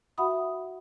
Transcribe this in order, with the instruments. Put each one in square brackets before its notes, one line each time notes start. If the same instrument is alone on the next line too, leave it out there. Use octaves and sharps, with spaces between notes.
[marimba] F#4 E5 F#5 B5 D#6